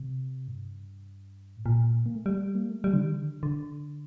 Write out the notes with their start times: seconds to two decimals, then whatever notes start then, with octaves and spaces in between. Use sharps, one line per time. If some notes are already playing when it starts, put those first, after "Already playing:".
Already playing: C3
0.48 G2
1.57 A2
1.66 A#2
2.06 A#3
2.15 A3
2.26 G3
2.55 A#3
2.70 A3
2.84 G3
2.93 D3
2.99 D#3
3.13 D3
3.43 D3